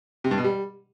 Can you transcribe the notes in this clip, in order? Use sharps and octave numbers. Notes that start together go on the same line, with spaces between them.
C3
G2
B2
G3